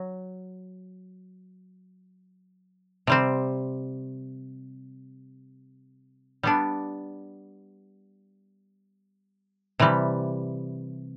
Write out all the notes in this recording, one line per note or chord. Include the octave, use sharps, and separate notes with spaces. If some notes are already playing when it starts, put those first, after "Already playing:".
Already playing: F#3
C3 G3 C4
G3 B3 D4
C3 E3 G3